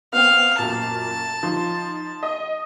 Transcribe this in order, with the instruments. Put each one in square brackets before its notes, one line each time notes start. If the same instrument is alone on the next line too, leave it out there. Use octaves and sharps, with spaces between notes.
[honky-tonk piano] B3 C4 G5 [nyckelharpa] F5
[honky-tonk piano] F#2 A#2 [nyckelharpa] A5
[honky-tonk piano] F3 D#4 C6
D#5